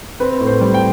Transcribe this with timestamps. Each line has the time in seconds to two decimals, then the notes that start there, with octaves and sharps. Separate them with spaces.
0.20 C4 B4
0.41 A2
0.47 C5
0.61 G3
0.74 G5